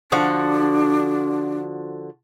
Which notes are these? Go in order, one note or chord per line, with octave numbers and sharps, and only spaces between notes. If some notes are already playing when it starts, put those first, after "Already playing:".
D3 F3 D4 F#4